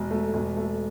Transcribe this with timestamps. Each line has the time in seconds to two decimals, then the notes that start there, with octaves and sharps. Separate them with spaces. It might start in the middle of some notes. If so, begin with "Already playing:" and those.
Already playing: E1
0.11 A3
0.34 E1
0.57 A3